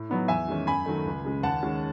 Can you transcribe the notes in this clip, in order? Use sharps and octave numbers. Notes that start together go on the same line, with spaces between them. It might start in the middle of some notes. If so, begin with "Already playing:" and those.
Already playing: A2
F#3 B3 D#4
E2 E5 G#5
D#3 G#3 C#4
F#2 G#5 B5
D#3 F#3 A3
C#2
C#3 G#3
D#2 F#5 A5
D#3 G#3 C#4